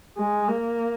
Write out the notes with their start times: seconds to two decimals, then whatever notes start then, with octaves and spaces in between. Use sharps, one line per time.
0.17 G#3
0.49 A#3